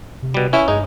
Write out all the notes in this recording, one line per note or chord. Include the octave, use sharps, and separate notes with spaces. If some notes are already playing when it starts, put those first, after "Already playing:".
C3
B2 G3
C#4 E4
G2 G#3 D#4